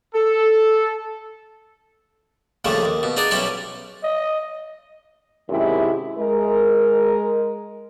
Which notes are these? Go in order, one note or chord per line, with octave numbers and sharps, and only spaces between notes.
A4
A#1 D#2 C#3 G3 A3
D#2
B2
D4 D#4 G#4 D5
B1 G3 C#4 E4
D#5
F#2 C3 D#3 G#3 E4 G4
G#3 A#4